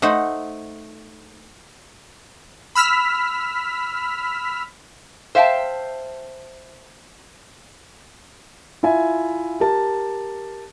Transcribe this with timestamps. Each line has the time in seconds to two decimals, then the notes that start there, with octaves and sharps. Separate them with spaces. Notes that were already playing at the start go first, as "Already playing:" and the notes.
0.02 A3 D#4 C5 F#5
2.75 B5 E6 F6 B6
5.35 C5 E5 F5 G5 A5
8.83 E4 F4 E5 G#5
9.60 G4 A#4 A5